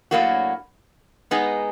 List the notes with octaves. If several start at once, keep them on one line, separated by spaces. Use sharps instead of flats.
A2 F#3 A#3 D4 F#4
G#3 B3 D#4 G#4